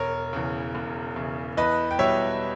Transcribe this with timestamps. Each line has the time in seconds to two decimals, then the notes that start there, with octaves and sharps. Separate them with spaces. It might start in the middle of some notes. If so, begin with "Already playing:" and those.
Already playing: E1 A#4 C#5
0.33 E2 C#3
0.75 E1
1.16 E2 C#3
1.57 E2 B4 D#5
1.91 G5
1.99 B2 G3 C#5 E5